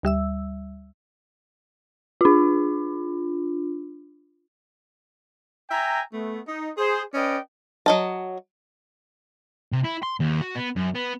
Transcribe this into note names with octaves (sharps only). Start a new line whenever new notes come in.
D2 G3 E5 E6
D4 F4
E5 G5 G#5 A#5
A3 B3
D#4
G#4 C5
C#4 B4 D5 D#5 G5
F#3 D#5 A5
C3
E4
C6
D#2
F#4
B3
F#2
B3